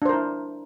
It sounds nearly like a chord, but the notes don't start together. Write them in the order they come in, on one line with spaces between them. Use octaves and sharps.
D4 C5 A#4 E4